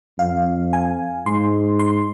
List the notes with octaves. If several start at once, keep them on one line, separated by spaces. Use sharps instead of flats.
F2 F5
G#5
G#2 C6
C6